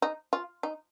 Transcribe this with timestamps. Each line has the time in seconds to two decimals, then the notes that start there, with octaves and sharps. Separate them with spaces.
0.02 D#4
0.33 F4
0.63 D#4